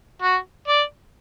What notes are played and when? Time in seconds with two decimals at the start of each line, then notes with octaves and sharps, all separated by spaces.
0.22 F#4
0.68 D5